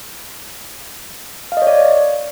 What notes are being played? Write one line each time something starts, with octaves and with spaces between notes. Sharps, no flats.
F5
D#5
C#5
D5